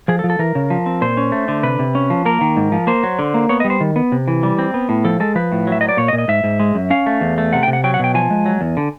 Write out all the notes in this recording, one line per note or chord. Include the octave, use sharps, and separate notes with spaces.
F3 G#4
A4
F3
A4
E3 A#4
C#3
F3
C4
A#2 C5
C#4
A3
D3
C3 B4
C3
C#4
F3
A#3 A#4
D#3
G#2
F3
A#3 C5
F#3
D3
A#3
B3 C#5
G3 D#5
C5
D#3
B3
C3
E3
G3
C4
B3
A2
F3 A4
G#3 A4
F3 B4
A2
F#3 E5
F#3 D#5
D5
A#2 C#5
D#5
A#2
D#5
G#2 E5
G#2
G#3
F#2
C#4 F5
A3
E2
A3
C3 F#5
C3 G5
F#5
F#3 G5
F#5
B2 G5
F3 G#5
G#3
F#3
E2
D3